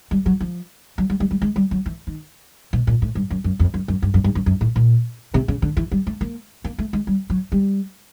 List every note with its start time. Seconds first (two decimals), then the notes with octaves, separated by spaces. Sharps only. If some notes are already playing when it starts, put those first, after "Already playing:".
0.11 G3
0.26 F#3
0.40 F3
0.98 F#3
1.10 G3
1.20 G3
1.31 G3
1.42 G#3
1.56 G3
1.71 F#3
1.86 E3
2.07 D#3
2.73 B2
2.87 A#2
3.02 A2
3.15 G2
3.30 F#2
3.44 F#2
3.59 F2
3.74 F#2
3.88 F#2
4.02 G2
4.14 F#2
4.24 G2
4.35 F#2
4.46 F#2
4.61 A2
4.76 A#2
5.34 C3
5.48 C#3
5.62 D3
5.77 E3
5.92 G3
6.07 A3
6.21 A#3
6.64 A#3
6.78 A3
6.93 G#3
7.07 G3
7.30 F#3
7.52 G3